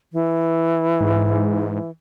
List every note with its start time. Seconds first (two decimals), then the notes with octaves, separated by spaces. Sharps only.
0.13 E3
1.00 G#2